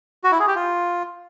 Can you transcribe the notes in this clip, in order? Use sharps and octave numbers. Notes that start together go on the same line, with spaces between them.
F#4
E4
G#4
G4
F4